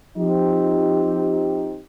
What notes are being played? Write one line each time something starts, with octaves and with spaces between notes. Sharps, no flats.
F3 C4 D#4 G4